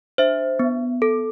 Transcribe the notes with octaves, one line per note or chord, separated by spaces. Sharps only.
D4 C5 E5
B3
A4